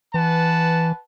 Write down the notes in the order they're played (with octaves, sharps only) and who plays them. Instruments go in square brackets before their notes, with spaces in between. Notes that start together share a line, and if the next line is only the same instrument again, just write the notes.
[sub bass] E3 [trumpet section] B4 F#5 A5